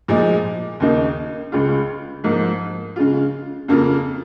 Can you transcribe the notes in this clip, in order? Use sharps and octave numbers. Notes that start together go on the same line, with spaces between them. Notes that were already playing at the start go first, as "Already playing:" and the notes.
A#2 F3 G#3 D#4
D#2 C#3 A#3 D#4
C#2 C#3 G#3 F4
G#2 F3 A#3
C#3 G#3 F4
F2 C#3 A#3 F4